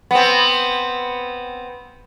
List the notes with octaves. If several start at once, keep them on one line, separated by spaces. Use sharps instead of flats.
B3 C4